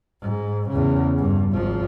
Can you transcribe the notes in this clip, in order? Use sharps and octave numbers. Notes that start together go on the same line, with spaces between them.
G#2
E2 C#3
G2
G#1 F3